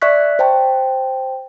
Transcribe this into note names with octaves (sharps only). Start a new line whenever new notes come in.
D5 E5 C#6 F#6 B6
C5 G5 A5